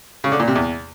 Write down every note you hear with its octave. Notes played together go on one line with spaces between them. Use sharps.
C#3
D3
A#2
C3
E2